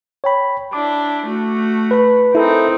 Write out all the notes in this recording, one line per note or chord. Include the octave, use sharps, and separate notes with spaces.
C#5 G5 B5
D4 E4 D6
A3 F#4
B4 B5
C4 D#4 E4 A4 A#4